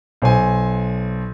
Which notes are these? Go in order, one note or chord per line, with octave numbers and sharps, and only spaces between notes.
B1 C5 G#5